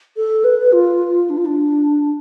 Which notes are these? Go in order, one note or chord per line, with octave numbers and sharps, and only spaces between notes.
A4
B4
F4
D4
F4
D4